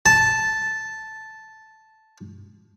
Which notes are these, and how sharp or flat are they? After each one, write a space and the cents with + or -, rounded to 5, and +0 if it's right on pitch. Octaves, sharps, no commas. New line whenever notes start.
A5 -5